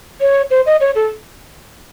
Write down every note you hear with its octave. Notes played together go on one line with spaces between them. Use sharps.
C#5
C5
D#5
C#5
A4